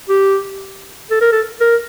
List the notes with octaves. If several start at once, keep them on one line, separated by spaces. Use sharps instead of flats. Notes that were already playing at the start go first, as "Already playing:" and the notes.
G4
A4
A#4
A4
A#4